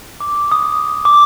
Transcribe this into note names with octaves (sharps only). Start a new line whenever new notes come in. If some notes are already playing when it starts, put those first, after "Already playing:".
D6
D#6
D6